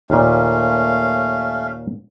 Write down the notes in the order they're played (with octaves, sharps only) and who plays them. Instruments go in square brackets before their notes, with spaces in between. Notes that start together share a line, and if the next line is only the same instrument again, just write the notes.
[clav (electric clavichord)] D#2 A#2 [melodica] A3 C#4 F5